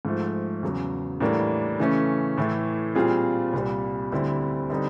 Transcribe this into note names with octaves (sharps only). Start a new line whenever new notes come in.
G#2 F3 A3
E2 C#3 F#3
A2 E3 G3 A#3 D4
C#3 E3 A3 C#4
A2 E3 A3
A#2 G3 C4 F4 G#4
C2 A#2 G3
D2 D3 G3 C4 E4
D3 G3 C4 D#4